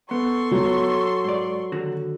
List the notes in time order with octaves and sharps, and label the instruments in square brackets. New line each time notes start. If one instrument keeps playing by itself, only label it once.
[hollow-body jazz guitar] B3 [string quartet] A4 C6 C#6
[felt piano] F#3
[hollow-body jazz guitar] G#2 D5
D#2 D3 F#4